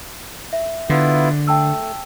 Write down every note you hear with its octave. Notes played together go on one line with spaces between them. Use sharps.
E5
D3 B3 E4 F4
A3 G5 A5 E6